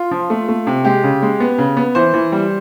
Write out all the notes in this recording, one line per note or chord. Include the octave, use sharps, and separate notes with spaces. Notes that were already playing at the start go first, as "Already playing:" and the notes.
Already playing: F4
F3
A3
A3
C3
G#3 G4
C#3
G#3
B3
C#3
B3
E3 C5
E3
G3